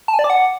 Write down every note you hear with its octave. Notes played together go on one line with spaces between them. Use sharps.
A5
G#5
D5
D6
F#5